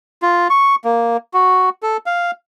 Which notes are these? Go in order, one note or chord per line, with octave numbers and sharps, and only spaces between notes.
F4
C#6
A#3
F#4
A4
F5